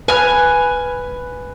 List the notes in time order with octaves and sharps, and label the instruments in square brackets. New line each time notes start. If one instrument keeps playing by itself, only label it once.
[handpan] B4 [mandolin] G#5 F6